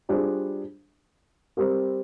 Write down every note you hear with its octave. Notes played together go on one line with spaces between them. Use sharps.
G3 D4 F4 G#4 C5
G3 C4 G4 A#4